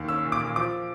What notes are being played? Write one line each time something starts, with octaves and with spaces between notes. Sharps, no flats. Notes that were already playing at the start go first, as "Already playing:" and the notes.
Already playing: D#2
C#4 E6
A#2
D6
A#2
F3 D6